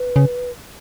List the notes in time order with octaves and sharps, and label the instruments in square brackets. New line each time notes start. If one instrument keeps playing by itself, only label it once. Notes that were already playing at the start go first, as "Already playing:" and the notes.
Already playing: [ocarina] B4
[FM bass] C#3